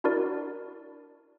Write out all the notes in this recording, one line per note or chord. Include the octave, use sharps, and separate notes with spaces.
D4 E4 F#4 A#4 D5